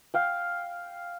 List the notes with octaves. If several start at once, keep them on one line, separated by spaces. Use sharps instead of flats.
F5 G5